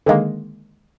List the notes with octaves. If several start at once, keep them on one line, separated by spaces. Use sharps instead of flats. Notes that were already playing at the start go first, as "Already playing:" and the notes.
D3 D#3 G#3 A#3